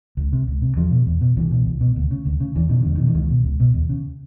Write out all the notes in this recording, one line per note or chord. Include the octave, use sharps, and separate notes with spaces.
C#2
C3
C#2
C3
E2 F3
B2
E2
B2
C2 E3
B2
C2
B2
D2
C#3
D2
C#3
E2 E3
B2 D#3
E2 D3
D#3
B2
E3
C#2 D#3
B2
C#2
B2
D#2
C#3